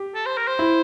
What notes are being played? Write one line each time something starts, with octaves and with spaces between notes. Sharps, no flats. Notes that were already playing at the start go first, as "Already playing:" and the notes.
Already playing: G4
A4
C5
A#4
C5
E4